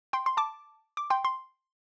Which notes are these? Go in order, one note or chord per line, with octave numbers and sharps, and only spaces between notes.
G5 C6
C6
A5 D6
D6
G5 C6
C6